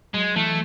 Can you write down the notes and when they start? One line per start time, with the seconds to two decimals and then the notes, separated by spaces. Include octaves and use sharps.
0.14 F#3 G#3
0.36 E3 A3